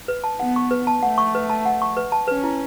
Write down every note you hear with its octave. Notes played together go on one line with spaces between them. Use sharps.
B4
A5
B3 F#5
C#6
B4
A5
A3 F#5
C#6
B4
A5
F#5
C#6
B4
A5
C#4 B4
E4